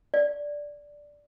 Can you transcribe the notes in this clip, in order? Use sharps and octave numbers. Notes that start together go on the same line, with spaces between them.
D5